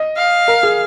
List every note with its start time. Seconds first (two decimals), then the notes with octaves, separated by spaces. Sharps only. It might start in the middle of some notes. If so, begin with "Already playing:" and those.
Already playing: D#5
0.17 F5
0.48 A#4
0.63 G#4